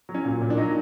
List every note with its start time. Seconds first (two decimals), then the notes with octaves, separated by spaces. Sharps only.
0.09 F#3
0.14 C#4
0.25 A#2
0.42 A#2
0.50 D4
0.57 F#3 D#4